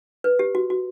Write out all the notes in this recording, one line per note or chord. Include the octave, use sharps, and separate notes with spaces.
B4
G4
F#4
F#4